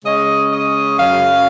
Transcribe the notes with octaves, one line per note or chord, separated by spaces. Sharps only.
C#3 G#3 C#4 D#5
D#5
F#2 C#3 F#3 C#4 F5